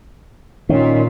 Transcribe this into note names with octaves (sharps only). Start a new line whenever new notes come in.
A#2 D#3 C#4